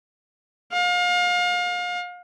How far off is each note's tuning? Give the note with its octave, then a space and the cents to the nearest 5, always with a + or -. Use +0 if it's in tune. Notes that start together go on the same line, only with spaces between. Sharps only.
F5 +35